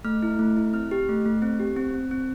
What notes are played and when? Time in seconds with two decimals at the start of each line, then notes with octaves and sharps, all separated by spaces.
0.04 A3 F6
0.22 E4
0.39 A3
0.57 E4
0.73 C4 F6
0.91 G4
1.09 A3
1.25 A3
1.42 C4
1.60 G4
1.77 C4
1.94 C4
2.11 C4